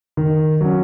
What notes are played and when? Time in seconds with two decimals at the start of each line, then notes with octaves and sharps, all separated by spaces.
0.17 D#3
0.61 F#3 C#4